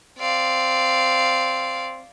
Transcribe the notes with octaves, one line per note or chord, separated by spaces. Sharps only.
C4 D5 F5